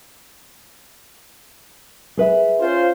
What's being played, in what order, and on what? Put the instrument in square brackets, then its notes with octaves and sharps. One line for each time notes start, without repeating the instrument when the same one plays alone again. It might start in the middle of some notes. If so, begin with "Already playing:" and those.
[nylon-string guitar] G#4 B4 E5
[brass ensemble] C#4 F4 C5